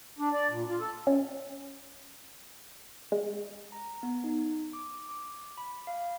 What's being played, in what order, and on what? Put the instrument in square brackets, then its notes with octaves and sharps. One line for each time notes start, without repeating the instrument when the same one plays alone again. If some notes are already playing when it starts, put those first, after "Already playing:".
[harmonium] D4
D5
A#2
F4
A4
[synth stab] C#4
G#3
[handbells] A#5
B3
D#4
D6
D6
B5
F5